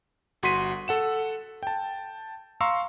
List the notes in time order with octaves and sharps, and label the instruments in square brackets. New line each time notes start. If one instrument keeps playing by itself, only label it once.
[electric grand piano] G1 F#4 C6 B6 D#7
A4 F#5 E7
G5 A5
F5 A#5 C6 C#6 E6